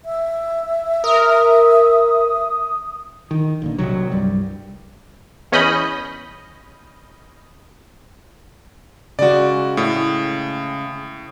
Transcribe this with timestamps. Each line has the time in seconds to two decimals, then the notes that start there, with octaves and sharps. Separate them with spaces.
0.05 E5
1.04 A#4 D#6
3.31 D#3
3.62 B1 A#2 D3
3.78 D#1 A#1 C3 F#3
4.11 C2 G2 G3
5.52 E2 C#4 D#5 B5 G6
9.19 C#3 G#3 F#4 D5
9.77 A2